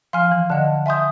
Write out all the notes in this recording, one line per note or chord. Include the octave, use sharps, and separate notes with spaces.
F3 F5 G#5 C6 F6
E3
D3 D#5 F#5 A5
E5 G#5 C6 D#6 G6